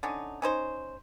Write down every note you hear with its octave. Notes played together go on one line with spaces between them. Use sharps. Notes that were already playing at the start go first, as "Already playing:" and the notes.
D3 C#4 D#4
C#4 D#4 C5